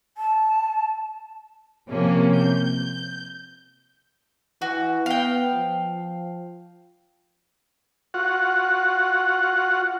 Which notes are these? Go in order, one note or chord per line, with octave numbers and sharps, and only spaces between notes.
A5
C3 F3 A#3 C#4
G6
E3 F#4
B3 F5 G5
F3
F4 F#4 F#5